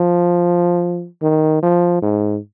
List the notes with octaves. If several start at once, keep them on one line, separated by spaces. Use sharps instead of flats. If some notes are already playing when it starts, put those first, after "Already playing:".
Already playing: F3
D#3
F3
G#2